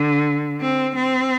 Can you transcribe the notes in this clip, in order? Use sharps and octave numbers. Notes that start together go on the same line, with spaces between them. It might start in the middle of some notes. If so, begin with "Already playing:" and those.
Already playing: D3
C4
C4